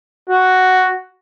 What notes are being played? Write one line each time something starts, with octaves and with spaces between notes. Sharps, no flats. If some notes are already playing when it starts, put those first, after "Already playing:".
F#4